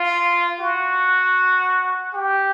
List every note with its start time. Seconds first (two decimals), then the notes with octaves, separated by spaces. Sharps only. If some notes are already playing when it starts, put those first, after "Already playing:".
Already playing: F4
0.60 F#4
2.13 G4